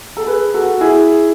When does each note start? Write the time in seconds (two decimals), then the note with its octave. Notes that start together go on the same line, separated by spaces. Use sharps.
0.17 A4
0.27 G#4 B4
0.54 F#4 A4
0.74 F#4
0.81 E4 G#4